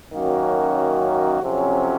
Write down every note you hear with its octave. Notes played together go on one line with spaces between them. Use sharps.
F#2 D#3 A#3 C#4 F#4
F2 C3 F#3 C#4